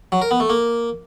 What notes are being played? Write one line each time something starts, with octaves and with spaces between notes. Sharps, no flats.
F#3
A#4
B3
A3
A#3